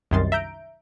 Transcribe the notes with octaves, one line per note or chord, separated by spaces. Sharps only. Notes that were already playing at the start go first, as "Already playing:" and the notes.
C2 F#2 D#3 C6 A6
E5 A#5 G6 D7